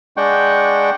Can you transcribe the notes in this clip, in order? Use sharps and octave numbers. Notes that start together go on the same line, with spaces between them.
G#3 D4 F#5 G5 C#6